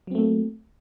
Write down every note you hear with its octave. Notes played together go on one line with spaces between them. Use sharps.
F#3 A3 A#3 C4